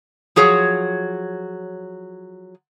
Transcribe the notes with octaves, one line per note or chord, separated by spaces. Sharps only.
F3 F#3 G#4 C#5